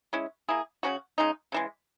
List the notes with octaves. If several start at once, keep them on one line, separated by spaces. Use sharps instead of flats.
G#3 C#4 E4
A#3 E4 G#4
C#3 F#3 C#4 F#4
C#3 G#3 D#4
C#3 E3 G#3